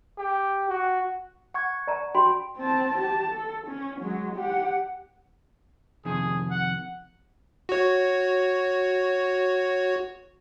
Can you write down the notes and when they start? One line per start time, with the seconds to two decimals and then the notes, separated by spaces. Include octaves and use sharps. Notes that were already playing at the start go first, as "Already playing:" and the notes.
0.18 G4
0.69 F#4
1.54 F#5 C#6 G#6
1.87 D5 A5 A#5
2.15 F#4 G5 B5 C6
2.58 C4 A5
2.98 G4 A5
3.32 A4
3.67 C#4
4.01 F#3 G#3
4.36 G4 F#5
6.05 F2 C3 D#3 G#4
6.51 F#5
7.69 F#4 C#5